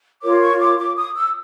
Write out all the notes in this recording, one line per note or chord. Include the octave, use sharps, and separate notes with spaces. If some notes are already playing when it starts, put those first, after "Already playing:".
F4 A#4 C#5 D6
C#6
D6
D6
D#6
E6